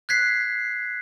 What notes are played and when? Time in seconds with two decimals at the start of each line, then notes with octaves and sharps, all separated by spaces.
0.09 F#6 G#6 B6 C7